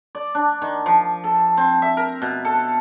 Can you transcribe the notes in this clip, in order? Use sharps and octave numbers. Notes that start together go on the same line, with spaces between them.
D5
D4
D#3
F3
A4
C4
E5
A#4
B2
A4